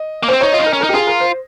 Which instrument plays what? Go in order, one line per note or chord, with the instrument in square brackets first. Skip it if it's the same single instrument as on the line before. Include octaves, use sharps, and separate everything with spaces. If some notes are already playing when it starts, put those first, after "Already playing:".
Already playing: [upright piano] D#5
[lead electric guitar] A#3
[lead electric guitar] C#4 [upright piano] C5
[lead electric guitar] C4
[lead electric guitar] D#4 [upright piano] C#5
[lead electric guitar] F4 [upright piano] D#5
[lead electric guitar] C#4
[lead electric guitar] D#4 [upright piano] A#4
[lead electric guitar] C#4
[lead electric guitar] D#4 [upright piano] A#4
[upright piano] G4
[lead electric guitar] F4 [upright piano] G#4
[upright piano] A#4
C5